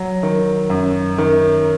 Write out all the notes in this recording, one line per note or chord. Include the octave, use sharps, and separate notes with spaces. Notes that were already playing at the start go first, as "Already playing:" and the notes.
Already playing: F#3
D#3
F#2
D#3